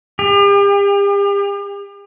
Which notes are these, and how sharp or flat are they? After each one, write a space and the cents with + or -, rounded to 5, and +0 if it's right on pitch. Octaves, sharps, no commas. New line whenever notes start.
G4 +40